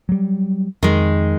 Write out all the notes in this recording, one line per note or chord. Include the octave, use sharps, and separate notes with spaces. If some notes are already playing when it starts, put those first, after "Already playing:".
F#3 G3
F2 D#3 G#3